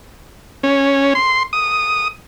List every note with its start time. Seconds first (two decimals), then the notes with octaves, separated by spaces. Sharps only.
0.63 C#4
1.15 C6
1.53 D#6